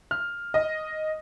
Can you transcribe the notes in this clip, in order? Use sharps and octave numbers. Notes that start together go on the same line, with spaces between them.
F6
D#5